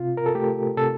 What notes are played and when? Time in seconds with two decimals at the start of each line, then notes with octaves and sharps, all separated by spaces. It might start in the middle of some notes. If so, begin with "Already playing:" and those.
Already playing: C3 F4
0.17 A#4
0.26 A4
0.35 A3 G4
0.77 C3 A4